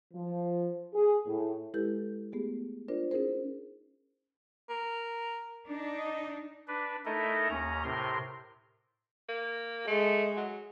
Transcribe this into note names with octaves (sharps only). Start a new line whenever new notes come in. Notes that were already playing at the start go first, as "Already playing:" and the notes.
F3
G#4
A2
G#3 E4 G4 A4 B4 G6
A3 B3 G4 G#4
D4 F4 A#4 C5 D5
C#4 D#4 E4 G#4 A#4 C5
A#4
D4 D#4
D#5
D4 B4
A3 D#4 E4 A4 A#4 D#5
D#2 C#4 A#5
A2 C3 A#4 C6
A#3
G#3 A3
F#3